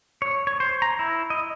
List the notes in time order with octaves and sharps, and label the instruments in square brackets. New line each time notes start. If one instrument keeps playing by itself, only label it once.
[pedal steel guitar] C#5
C#5
C5
A#5
E4
D#5